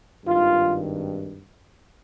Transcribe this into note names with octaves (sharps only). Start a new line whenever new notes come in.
G#1 G2 D#3 F4